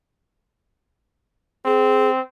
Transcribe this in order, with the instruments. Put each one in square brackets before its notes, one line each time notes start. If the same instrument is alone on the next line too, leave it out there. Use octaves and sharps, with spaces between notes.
[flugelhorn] C4 [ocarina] G#4